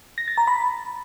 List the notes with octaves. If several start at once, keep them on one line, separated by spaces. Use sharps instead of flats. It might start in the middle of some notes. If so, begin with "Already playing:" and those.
A#6
A6
A#5
B5